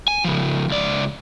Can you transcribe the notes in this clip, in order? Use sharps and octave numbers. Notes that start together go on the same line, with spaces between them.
G#5
C#3 F3
C#2 D5